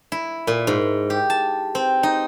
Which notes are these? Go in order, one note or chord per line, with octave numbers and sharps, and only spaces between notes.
E4
A#2
G#2
G4
A5
C4
D#4